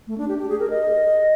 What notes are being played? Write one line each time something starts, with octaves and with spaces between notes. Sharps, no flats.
A3
D4
G4
G4
G#4
A#4
D#5